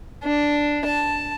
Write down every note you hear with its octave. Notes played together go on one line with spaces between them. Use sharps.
D4
A5